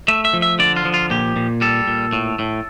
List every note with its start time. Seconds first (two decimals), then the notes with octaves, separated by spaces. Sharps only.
0.08 A3 E5
0.25 E5
0.33 F3
0.42 E5
0.59 D3 D5
0.76 F4
0.85 F3
0.94 F4
1.11 A#2 G4
1.36 A#2
1.61 G3 A4
1.88 A#2
2.13 A2
2.39 A2